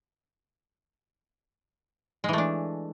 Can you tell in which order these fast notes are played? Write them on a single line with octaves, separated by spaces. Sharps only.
G#3 E3 A3 D4